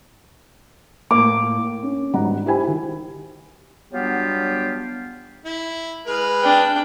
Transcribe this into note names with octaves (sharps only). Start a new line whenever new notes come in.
A2 A#3 D6
C#4
G#1 G2 G3 F#5 A#5
E4 G4 C5 G5 G#5 B5
D#3 F#4
F#3 G3 B3 D4 F4 G4
E4
G#3 B4 F6
D4 G5